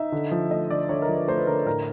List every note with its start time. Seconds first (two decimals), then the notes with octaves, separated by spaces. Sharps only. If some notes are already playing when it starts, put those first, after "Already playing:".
Already playing: D#4 E5
0.12 D3
0.31 F3
0.50 A3 D#5
0.70 D3 D5
0.89 D3 C#5
1.02 A#4
1.08 F3
1.15 B4
1.27 A3 C5
1.38 B4
1.47 D3 A#4
1.66 A2 A#4